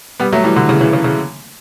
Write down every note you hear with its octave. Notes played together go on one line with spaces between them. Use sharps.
G3 B3
F#3 A3
E3 G3
D3 F#3
C#3 E3
C#3 E3
C#3
C#3